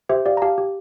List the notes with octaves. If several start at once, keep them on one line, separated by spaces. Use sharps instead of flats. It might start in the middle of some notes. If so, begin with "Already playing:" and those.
G4 C5 E5
G4 D5 F5
A#5
G4 F5 A5
G4